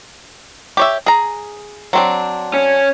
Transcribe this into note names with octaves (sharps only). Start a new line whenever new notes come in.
G4 C#5 E5
G#4 A#5
F#3 C4 D4
C#4